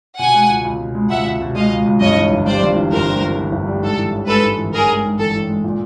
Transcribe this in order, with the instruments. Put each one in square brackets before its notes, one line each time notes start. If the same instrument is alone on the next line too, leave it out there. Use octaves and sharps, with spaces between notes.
[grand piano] B2 [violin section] F#5 G#5
[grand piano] G#3
C#2
C#2
B2
G#3
[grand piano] C#2 [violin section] E5 F#5
[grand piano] C#2
B2
[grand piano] G#3 [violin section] D#5 F5
[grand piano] C#2
C#2
[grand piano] G2 [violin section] C#5 D#5
[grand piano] E3
G1
[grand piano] G3 [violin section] C5 D5
[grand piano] G2
E3
[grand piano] G1 [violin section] A#4 C5
[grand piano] G3
G2
E3
G1
G3
[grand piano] G#2 [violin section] A4
[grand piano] E3
A1
[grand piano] G#3 [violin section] A4 B4
[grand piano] G#2
E3
[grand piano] A1 [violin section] G#4 A#4
[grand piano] G#3
G#2
[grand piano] E3 [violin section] A4
[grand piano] A1
G#3
A#2